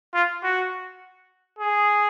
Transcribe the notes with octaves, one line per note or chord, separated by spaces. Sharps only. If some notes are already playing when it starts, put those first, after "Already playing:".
F4
F#4
G#4